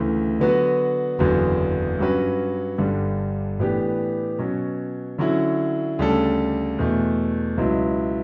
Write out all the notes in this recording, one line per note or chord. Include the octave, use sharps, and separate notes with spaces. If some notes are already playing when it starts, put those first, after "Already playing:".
Already playing: D2 C#3 E3 A3
D3 F#3 B3 F#4 B4
F#1 E2 D3 F#3 B3
G2 F#3 C#4 F#4 B4
G1 G2 D3 G3 D4
A2 E3 B3 D4 G4
B2 F#3 C#4
D3 F#3 C#4 E4
D2 C#3 G3 D4 A4
E2 B2 A3
C#2 B2 F#3 B3 E4